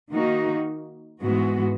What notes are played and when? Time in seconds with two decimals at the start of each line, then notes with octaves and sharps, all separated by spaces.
0.12 D#3 A#3 D#4 F#4
1.22 G#2 E3 G#3 B3 F#4